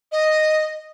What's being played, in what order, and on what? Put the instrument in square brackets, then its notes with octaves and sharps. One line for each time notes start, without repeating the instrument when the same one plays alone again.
[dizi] D#5